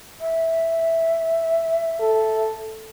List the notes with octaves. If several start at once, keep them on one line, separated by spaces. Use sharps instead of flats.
E5
A4